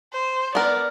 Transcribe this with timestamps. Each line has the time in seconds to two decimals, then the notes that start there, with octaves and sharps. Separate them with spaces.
0.13 C5
0.55 B3 A#4 D5